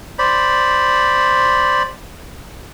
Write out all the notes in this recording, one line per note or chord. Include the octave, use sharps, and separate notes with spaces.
C5 D5 B5